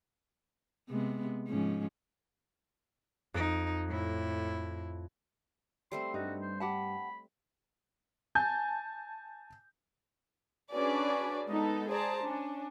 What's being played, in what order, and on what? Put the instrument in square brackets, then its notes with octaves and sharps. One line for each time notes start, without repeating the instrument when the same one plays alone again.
[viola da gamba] C3 G#3 B3
G#2 F3 C#4
[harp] F2 D7 [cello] D#4
[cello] A2 E4
[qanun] G3 A3 C4 [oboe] C6
[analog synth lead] G2 [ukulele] D#4 [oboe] F#4
[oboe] C5
[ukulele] G4 F#5 A5 [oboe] B5
[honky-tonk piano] G#5 A5 G6
[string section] C#4 D4 F#4 G#4 B4 D5
G#3 B3 D#4 A4
G#4 C5 D5 A5 A#5
C#4 D4